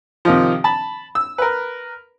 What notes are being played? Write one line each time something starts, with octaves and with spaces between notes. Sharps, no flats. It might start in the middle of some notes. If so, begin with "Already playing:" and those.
C3 D#3 F3
A5 B5
E6
A#4 B4